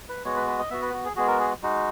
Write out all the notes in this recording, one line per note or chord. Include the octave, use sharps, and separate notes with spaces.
B4
G#3 B3 F#4 C#5
B4
B4
D#5
B3 F#4 E5
B4
F#4
G#4
G#3 B3 F#4 G#4
A#4
G#4
G#3 D#4 F#4